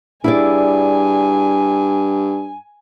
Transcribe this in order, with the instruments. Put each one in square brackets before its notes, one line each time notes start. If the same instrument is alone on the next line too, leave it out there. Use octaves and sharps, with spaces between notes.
[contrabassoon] G2 [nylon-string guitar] E4 G#4 D5 [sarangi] G#5